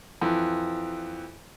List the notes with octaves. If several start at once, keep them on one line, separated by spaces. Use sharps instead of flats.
F2 E3